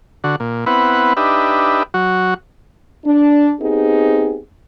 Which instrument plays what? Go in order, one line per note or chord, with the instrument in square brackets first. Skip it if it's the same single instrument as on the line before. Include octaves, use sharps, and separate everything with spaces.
[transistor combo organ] D3 F#4
A#2
B3 C4 E4 B4 F#5
D4 D#4 G4 B4 E5
F#3 F#4
[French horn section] D4
B3 C4 D#4 G4 G#4